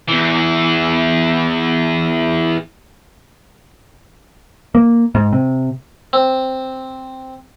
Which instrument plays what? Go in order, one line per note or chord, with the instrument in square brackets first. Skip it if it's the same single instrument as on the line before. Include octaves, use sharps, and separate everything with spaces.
[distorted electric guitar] E2 E3
[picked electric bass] A#3
G#2
C3
[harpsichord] C4